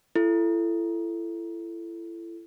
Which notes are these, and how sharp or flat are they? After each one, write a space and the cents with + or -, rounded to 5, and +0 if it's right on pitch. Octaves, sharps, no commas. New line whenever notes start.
E4 +35 A4 +0